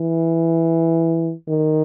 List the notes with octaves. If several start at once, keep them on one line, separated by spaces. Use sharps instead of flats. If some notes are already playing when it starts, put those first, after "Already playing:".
Already playing: E3
D#3